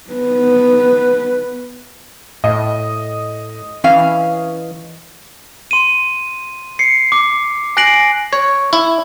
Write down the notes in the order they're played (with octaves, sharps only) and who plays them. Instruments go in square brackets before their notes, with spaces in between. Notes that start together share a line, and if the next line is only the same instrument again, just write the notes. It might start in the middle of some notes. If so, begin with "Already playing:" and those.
[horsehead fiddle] B3 B4
[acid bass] A2 [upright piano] D#5
[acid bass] E3 [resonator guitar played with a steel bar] C#4 F5
[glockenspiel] C6 D#7
C7 C#7
D6
G#5 F#6 A#6 C7 D7 F#7
[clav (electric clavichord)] C#5
E4